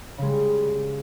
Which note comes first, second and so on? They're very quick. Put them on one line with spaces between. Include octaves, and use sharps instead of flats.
C#3 G#3 G3